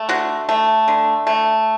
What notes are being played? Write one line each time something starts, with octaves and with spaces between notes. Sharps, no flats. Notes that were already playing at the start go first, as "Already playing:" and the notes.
Already playing: A3
D3 F#4
A3
D3
A3